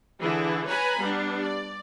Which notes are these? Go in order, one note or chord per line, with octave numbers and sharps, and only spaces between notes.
D3 E3 E4 G#4
B4 C#5 G#5 A#5 B5
G3 B3 D4
D5